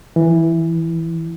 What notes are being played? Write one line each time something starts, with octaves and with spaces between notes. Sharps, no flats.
E3